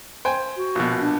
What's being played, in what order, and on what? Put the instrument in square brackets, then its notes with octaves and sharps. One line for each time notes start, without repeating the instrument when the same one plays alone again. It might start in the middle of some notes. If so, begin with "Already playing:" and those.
[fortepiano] C5 G5 G#5
[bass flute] F#4
[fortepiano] A#1 B2
[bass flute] D4